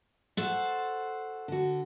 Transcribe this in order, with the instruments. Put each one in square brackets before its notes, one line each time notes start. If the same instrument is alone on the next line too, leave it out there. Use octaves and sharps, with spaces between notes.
[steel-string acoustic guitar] F#4 A4 C5
[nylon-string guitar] D3 F#4